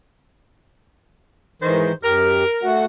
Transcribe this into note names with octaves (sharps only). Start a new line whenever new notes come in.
G#2 D#3 E3 C5
F#2 G4 A#4
A3 F#4 F#5